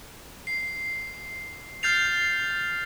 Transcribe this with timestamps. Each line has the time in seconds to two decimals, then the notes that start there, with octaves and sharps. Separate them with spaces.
0.47 C7
1.83 F6 G6 A6 C7 F7